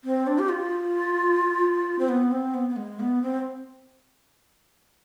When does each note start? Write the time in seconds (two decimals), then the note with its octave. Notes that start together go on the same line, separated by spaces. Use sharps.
0.04 C4
0.27 D4
0.39 G4
0.49 F4
1.99 C4
2.09 B3
2.31 C4
2.54 B3
2.69 B3
2.76 G#3
2.99 B3
3.22 C4